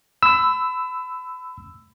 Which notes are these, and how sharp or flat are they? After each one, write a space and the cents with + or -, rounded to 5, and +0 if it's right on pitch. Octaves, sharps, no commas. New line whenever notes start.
B5 +30 E6 +0